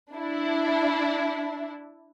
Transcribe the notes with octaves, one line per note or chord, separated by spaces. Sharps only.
D4 E4